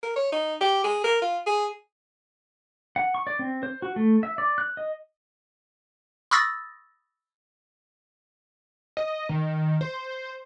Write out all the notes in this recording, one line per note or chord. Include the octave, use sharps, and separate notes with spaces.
A#4
C#5
D#4
G4
G#4
A#4
F4
G#4
F#5
C#6
D5
C4
C5
F#4
A3
E5
D5
F#6
D#5
B5 C#6 D#6 E6 A6 A#6
D#5
D#3
C5